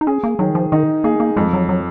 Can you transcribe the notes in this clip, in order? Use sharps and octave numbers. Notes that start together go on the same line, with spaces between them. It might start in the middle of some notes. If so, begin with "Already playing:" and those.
D#4
C#4 G#4
A#3
D#3 F#3
F3
D#3 D#4
A#3 G#4
A#3
F2 G#3
F#3
F#3